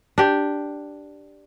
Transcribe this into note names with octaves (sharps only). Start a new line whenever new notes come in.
D4 G4